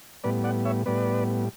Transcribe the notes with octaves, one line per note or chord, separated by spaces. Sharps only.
A2 G3 B3 B4 D5
D5 F#5
C#5 E5
A2 G3 B3 B4 D5